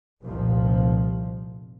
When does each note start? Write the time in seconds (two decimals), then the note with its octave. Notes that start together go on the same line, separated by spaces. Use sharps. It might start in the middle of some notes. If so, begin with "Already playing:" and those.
0.22 F1 C2 A#2 F3